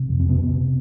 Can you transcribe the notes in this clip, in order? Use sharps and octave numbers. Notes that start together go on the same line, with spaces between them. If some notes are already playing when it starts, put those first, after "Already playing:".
Already playing: C3
F2
C4
C3 B3
C3